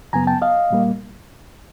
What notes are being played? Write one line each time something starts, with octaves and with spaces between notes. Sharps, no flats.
F#2 C#3 F#3 B3 G#5 A#5
G5 A5
D#5 F5
A#2 G3 A#3